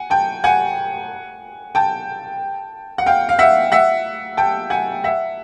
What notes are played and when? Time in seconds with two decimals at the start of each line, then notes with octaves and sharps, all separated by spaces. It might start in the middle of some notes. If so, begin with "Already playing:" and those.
Already playing: F#5 G#5
0.10 G5 A5
0.44 F#5 G#5
1.75 G5 A5
2.98 F#5
3.06 F5 G5
3.29 F5
3.39 E5 F#5
3.72 E5 F#5
4.37 G5 A5
4.70 F#5 G#5
5.04 E5 F#5